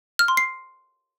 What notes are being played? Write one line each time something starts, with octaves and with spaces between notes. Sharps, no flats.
F6
C6
C7